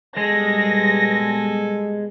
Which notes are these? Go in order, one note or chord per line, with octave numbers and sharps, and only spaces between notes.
A#2 G3 G#3 B3 A4 G#5 A#6